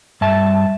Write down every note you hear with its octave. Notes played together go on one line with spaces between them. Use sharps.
G2 E5 A5